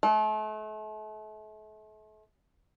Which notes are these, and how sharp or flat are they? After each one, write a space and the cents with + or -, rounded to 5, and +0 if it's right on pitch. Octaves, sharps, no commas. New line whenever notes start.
A3 -40